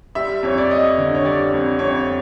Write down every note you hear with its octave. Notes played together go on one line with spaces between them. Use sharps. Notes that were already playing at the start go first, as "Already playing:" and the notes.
G3 E5
F2 C#5
D5
F2 D#5
D3
C#5
G3 D5
F2
F2 C#5